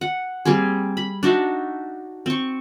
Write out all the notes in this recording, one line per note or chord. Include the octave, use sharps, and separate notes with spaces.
F#5
G3 A#3 C4 G#4
B5
D4 D#4 F#4 E5
C4 C#6